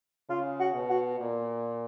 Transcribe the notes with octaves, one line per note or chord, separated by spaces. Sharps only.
C#3 F4
F#4
B2
F#4
A#2